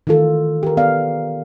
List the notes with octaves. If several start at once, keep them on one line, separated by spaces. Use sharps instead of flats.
D#3 E3 F4 A4
G4 A#4
B3 D5 F5